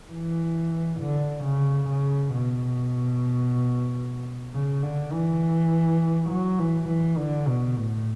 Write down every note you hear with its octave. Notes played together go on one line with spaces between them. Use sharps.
E3
D3
C#3
C#3
B2
C#3
D3
E3
F#3
E3
E3
D3
B2
A2